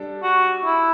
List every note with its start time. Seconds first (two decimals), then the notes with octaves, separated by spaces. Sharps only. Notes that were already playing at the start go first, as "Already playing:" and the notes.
Already playing: G3 D4 A4
0.23 F#4
0.65 E4